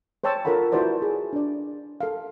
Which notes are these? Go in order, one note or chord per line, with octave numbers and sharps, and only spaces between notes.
C5 C#5 G5 A5 C#6 E6
F4 A4 A#4 C#5 F#5 B5
E4 F#4 B4 C5 D5 A5
G#4
D4 D5
A4 F5